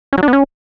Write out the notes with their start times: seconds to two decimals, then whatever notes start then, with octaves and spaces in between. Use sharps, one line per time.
0.13 C#4
0.18 F#3
0.23 D4
0.28 B3
0.33 C#4